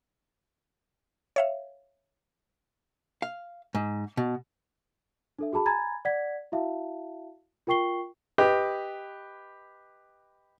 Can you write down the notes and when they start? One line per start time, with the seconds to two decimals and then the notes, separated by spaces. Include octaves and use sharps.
1.36 C#5 E5 F5
3.22 F5
3.75 G#2
4.17 B2
5.39 D4 A4 E5
5.53 F#4 G#4 A5 B5
5.66 G#5 A#5 B5 G#6 A6
6.05 D5 F#5 G#6 B6
6.52 E4 F#4 E5 F5 A5
7.67 F4 A#4 G5 C#6 C7 G7
8.38 G4 B4 D#5